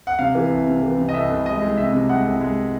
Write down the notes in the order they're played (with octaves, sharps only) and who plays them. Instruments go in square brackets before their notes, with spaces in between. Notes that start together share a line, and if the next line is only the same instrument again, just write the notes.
[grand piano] F#5
C3 F5
E3
C2
C3
E3
C3
D#5
C2 E5
C2
G#3 D#5
G#3
C3 E5
C3
G#3 F#5
C2
G#3